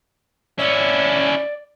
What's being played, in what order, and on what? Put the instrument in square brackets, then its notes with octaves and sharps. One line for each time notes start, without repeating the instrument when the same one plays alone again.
[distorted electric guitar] C#4 E4 [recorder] D5